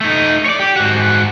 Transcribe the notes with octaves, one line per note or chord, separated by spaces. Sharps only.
A3 D#4
C#5 D5
G4
G#2 F#4